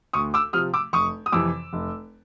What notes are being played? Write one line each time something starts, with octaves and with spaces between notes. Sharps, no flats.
D2 C#6 D#6
D6 E6
C3 F3 D#6 F6
D6 E6
F1 C#6 D#6
D#6
F2 C3 E3 D6 E6
F1